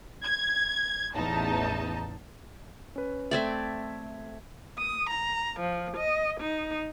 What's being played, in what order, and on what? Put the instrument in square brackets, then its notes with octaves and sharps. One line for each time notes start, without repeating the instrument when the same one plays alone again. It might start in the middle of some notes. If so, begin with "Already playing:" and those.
[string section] G#6
A1 E2 D#4 A5
[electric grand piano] C#4 B4
[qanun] A3 C4 D5 [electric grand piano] E5 G#6 B6
[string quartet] D#6
A#5
F3
D#5
D#4